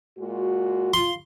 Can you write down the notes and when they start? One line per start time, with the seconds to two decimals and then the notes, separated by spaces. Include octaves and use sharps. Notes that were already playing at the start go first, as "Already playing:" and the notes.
0.18 A#2 G#3 F#4
0.94 F4 C6